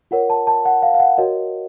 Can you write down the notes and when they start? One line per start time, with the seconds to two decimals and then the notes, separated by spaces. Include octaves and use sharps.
0.11 F4 A#4 C#5 F#5
0.30 A5
0.47 A5
0.65 F#5
0.83 F5
0.94 F5
1.00 F#5
1.18 F#4 A#4 C#5 D#5